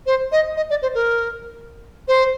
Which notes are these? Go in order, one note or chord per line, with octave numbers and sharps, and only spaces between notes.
C5
D#5
D#5
D5
C5
A#4
C5